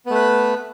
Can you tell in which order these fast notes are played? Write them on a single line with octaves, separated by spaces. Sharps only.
B3 A3 B4